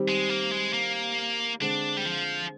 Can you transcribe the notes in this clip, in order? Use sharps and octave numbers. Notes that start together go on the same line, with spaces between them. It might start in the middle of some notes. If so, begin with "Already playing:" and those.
Already playing: D#3 G3 C4 G4
G#3
A#3
G#3
A#3
D3 G#3 C4 D4
G3
F3